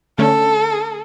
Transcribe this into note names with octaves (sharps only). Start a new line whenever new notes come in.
D3 A3 C#4 A4